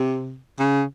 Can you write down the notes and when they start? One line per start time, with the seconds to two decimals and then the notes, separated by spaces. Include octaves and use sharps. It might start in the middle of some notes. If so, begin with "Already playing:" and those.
Already playing: C3
0.60 C#3